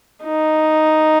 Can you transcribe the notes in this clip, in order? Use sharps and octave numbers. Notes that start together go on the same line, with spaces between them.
D#4